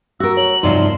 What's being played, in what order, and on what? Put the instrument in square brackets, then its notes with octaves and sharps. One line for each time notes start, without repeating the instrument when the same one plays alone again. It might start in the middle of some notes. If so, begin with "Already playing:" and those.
[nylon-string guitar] F#4 A#4 [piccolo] E6
[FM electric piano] C#5 [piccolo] F#7
[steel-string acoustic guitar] G2 C3 F3 [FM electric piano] D#4 [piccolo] C6